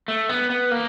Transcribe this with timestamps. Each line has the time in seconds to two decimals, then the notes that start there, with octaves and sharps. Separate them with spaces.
0.08 A3
0.29 B3
0.50 B3
0.71 A#3